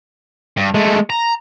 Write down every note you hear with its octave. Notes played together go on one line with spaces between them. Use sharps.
G2
G#3 A3
A#5